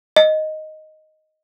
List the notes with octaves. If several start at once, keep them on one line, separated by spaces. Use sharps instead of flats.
D#5